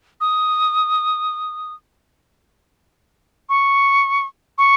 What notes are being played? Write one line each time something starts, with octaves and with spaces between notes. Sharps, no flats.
D#6
C#6
C#6